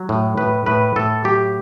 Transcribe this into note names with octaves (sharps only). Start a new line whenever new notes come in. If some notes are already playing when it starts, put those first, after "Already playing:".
Already playing: F#3
A2
A2 B4
A2 B4
A2 A4
F#3 G4